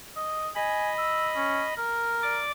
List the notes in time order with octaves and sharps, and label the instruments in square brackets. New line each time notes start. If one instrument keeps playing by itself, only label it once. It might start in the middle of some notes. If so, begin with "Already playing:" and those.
[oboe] D#5
[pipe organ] D#5 B5 [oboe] G#5
[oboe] E6
C#4
A#4
[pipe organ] D5 D6